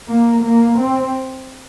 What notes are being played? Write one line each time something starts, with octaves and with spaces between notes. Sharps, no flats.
A#3
A#3
C4